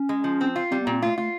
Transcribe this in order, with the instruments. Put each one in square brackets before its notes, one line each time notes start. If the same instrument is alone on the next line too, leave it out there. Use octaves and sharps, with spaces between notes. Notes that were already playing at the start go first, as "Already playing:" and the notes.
Already playing: [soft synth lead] C#4
[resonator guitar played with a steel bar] G#3
F3
C4
F4
[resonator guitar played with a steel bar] G3 [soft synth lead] C4
[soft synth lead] B3
[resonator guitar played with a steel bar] A#2 [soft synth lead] C4
[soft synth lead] A3 [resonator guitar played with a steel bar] F4
[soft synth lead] A3 [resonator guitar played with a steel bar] F4